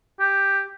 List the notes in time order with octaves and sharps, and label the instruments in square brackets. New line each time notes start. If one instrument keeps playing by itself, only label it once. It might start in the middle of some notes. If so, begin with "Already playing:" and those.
[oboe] G4